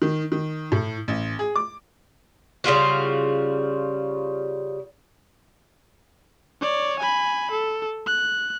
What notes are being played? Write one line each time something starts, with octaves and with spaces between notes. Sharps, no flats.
D#3
D#3
A2
A1
G#4
D6
C#3 G3 F4 F#4
C#5 D5
G#5 B5
A4
F#6